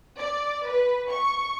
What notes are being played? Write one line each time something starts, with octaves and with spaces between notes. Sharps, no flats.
D5
B4
C#6